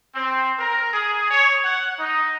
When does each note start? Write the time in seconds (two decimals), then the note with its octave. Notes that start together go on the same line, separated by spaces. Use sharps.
0.14 C4
0.58 A#4
0.93 G#4
1.31 C#5
1.64 F#5
2.00 D#4